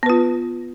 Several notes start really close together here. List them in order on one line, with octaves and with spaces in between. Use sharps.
B3 B4 F4